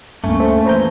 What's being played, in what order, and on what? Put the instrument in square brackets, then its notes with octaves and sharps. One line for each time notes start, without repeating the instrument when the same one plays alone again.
[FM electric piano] D2 G2 [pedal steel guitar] A3 [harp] A#3 C#4
[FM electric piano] A4 C5 E5
[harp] A#2 E3 [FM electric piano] C5 A#5 G6